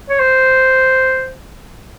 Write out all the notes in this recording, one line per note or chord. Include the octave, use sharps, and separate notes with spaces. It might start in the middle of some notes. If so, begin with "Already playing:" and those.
C#5
C5